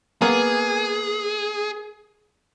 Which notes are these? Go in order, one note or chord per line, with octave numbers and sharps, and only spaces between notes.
A#3 B3 G#4